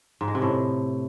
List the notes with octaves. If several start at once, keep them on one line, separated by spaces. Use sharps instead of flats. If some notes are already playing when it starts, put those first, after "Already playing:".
G#2
G#3
C3
A2